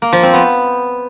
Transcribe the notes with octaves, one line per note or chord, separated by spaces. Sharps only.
A#3
F3
C4
B3